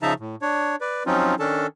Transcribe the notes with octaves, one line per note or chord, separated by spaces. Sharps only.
C#3 F3 D#4 E5 A5 A#5
A2
D4 C#5
B4 D5
F3 F#3 C4 C#4 D#4 F4
D#3 C#4 D4 A4 A5